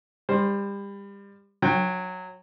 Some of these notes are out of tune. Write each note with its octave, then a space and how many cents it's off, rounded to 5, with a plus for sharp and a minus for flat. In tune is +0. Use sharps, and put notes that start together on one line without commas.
G3 +30 C5 +0
F#3 -15 G5 +20